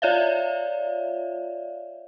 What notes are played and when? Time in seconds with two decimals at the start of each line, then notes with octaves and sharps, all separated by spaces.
0.02 F4 C#5 D5 E5 F5